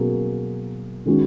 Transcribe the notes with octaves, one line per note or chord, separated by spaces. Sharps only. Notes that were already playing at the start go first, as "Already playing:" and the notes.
Already playing: B2 F#3 A#3 C#4 G#4
D#3 G#3 C#4 F#4